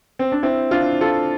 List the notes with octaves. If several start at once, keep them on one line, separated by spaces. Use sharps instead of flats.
C4
D4
C4 E4
D4 F4
F4 A4